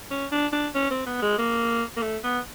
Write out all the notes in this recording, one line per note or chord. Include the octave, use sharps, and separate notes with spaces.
C#4
D4
D4
C#4
C4
B3
G#3
A#3
A#3
A3
B3